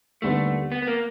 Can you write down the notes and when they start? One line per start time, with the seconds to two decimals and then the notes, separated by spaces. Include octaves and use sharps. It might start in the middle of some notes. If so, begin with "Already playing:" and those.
0.22 D#2 D3 G3 A3 B3
0.72 B3
0.82 B3
0.87 A#3